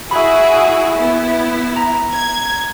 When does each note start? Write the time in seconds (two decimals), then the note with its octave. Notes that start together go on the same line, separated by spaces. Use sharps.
0.11 E4 F#4 G#4 E5 B5
0.98 B3 E4
1.76 A#5
2.13 G#6